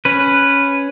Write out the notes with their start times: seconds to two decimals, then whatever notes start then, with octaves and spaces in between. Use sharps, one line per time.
0.05 C#4 B4